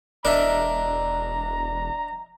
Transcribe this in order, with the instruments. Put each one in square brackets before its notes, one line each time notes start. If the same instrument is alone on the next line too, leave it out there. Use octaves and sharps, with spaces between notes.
[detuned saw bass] E1 [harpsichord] D4 [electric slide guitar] A#4 D#5 E5 [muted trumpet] A#5